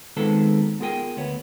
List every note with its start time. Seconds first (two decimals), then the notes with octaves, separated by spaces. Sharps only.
0.17 D#3 G#3 B3 C4 F4 A4
0.80 B3 F4 G#4 A#4 G5 G#5
1.17 D2 B3 C#5